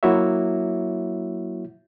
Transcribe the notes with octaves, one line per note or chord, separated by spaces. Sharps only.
F#3 A#3 E4 F#4 C#5 E5